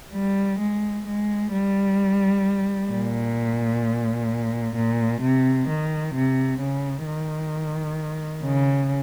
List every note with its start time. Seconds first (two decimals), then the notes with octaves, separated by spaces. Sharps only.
0.13 G3
0.59 G#3
1.06 G#3
1.52 G3
2.91 A#2
4.76 A#2
5.21 C3
5.68 D#3
6.14 C3
6.60 C#3
7.06 D#3
8.44 C#3